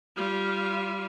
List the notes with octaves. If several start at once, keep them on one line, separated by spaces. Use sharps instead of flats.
G3 F4